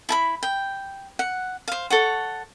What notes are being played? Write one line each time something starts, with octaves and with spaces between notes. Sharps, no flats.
E4 A5 B5
G5
F#5
C5 F5
A4 C#5 F#5